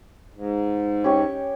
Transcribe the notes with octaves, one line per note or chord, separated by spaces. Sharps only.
G#2
C#4 G4 C#6